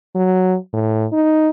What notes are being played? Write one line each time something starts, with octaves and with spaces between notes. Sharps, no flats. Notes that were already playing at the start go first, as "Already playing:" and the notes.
F#3
A2
D#4